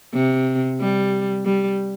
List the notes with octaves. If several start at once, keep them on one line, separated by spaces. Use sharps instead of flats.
C3
G3
G3